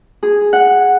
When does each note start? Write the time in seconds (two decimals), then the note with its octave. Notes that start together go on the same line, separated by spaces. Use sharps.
0.23 G#4
0.53 F#5